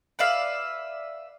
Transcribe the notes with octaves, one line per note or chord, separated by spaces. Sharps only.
B4 D5 E5 F5